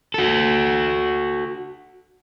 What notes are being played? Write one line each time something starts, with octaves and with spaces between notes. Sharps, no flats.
F#4 A4